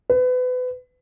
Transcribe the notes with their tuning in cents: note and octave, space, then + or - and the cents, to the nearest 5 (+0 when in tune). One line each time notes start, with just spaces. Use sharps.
B4 +30